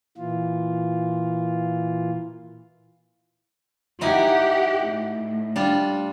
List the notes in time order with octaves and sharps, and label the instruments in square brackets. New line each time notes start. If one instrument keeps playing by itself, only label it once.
[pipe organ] A#2 E3 F4
[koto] D#4 E4 G#5 [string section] G4 F#5
[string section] A2
[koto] G3 D4 F4